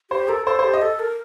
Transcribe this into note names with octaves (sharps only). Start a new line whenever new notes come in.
G4 C5
A4 A#4
A4 C5
C5
G4
D#5
A4
A#4